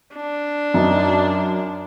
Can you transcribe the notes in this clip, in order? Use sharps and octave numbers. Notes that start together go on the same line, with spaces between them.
D4
F#2 D#4